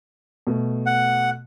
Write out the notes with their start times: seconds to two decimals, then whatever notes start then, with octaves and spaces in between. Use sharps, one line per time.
0.47 B2 A3
0.86 F#5